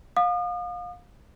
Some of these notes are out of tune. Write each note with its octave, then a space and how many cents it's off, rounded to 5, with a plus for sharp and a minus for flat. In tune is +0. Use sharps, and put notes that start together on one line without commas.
F5 +30 D#6 -40